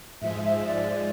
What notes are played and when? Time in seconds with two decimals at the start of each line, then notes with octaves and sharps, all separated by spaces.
0.22 G#2 F3 G#3 E5
0.44 E5
0.67 D5